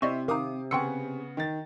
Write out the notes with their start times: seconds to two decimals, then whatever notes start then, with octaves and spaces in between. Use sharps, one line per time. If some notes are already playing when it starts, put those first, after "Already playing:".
0.02 C3 E4 C5 D5 D#5 C#6
0.28 D#3 D#4 F5 D6 D#6
0.71 C#3 B3 G#4 G5 C6 C#6 E6 C#7
1.37 D#3 A6